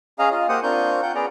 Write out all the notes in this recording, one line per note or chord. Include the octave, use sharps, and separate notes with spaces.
C#4 G#4 D#5 F5 A#5
F4 D#5
A#3 G4 C5 D#5 F#5 D#6
C4 D4 F4 A#4 C#6 G6
F4 F#5 G5 G6
B3 C#4 G#4 D5 A#5